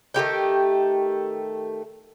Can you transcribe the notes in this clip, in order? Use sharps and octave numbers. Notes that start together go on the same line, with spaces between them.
D#3 A3 G4 G5